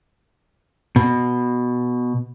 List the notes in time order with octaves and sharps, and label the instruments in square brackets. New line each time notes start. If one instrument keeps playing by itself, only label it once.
[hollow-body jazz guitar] B2